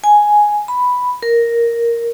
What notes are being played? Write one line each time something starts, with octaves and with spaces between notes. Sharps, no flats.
G#5
B5
A#4